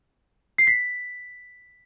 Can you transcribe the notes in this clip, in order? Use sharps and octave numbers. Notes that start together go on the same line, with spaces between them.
C7
B6